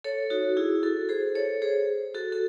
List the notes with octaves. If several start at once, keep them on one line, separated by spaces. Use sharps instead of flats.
A4 C#5
D#4 F#4
E4 G#4
F#4 A4
G#4 C5
A4 C#5
G#4 C5
F#4 A4
A4